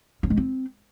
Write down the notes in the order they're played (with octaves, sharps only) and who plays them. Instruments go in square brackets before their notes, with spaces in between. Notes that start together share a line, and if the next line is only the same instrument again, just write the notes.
[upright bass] C#4
G#3
C4